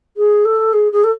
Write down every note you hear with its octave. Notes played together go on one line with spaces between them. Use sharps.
G#4
A4
G#4
G#4
A4